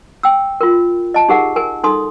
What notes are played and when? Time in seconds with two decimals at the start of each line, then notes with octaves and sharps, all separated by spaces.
0.23 G5 E6
0.61 F4 A#4
1.14 D#5 A5
1.29 D#4 G4 G#4 A#4 F#5
1.56 A#4 G#5
1.84 D#4 A4 C6 D#6